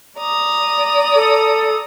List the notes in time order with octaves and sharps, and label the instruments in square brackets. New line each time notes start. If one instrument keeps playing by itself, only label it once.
[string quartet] D5 A#5 D#6
[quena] A4